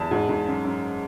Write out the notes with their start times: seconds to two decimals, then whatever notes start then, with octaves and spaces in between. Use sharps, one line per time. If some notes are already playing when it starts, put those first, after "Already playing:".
Already playing: E2 A5
0.11 G#2
0.29 G#2
0.47 F#2
0.64 F#2